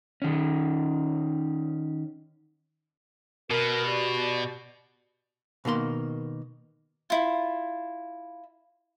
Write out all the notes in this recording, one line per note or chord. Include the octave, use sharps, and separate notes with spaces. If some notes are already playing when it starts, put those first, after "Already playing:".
D#3 C#4
B2 A#4
F#4 G4 D5
B2 D#3 A#3 C6
E4 F4